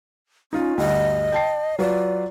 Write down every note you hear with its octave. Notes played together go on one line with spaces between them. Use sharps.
C#4 D#4 F4
D2 G2 D#5 F#5
G5 A5 C7
F#3 F4 B4 D5